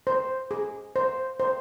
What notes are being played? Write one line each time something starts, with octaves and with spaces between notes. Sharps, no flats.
C5
G#4
C5
C5